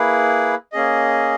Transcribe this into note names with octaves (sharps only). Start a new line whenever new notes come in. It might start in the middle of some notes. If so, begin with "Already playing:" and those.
Already playing: A#3 E4 G#4 B4
A#3 C#4 G#4 D#5